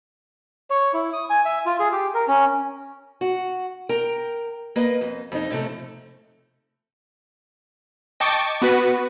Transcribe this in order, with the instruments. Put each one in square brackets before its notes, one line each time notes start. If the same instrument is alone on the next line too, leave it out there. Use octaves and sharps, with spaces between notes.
[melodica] C#5
E4
D#6
G#5
E5
F4
G#4
G4
A#4
C#4
[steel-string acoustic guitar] F#4
A#4 G5 A#5
A#3 B4 D#5
F2
F2 D#4
A2 C3 F3 A3
[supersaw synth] D#5 G5 A5 C#6 D6 A6
B3 F#4 B4